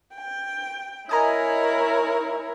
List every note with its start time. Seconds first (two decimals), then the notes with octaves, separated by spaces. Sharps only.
0.15 G5
1.09 E4 A#4 C#5 D#5 G#5 A#5